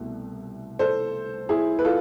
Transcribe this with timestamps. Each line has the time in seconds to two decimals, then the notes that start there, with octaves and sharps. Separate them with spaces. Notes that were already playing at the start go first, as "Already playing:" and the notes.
Already playing: C2 B2 A3
0.79 A4 C5
1.49 E4 G#4
1.79 B4
1.85 F4 A4